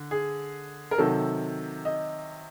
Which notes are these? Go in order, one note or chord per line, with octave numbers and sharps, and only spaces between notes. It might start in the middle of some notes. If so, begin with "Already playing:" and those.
Already playing: D3
G#4
A#4
C3 D#3 F#3 A4
D#5